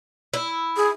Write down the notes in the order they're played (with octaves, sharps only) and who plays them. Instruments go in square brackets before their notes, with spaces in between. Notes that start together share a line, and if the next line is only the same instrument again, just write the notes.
[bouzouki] E4
[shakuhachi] G#4